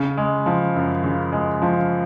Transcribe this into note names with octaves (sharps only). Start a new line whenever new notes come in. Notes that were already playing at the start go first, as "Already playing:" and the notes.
Already playing: C#3
G#3
F3
F#2
C#3
G#3
F3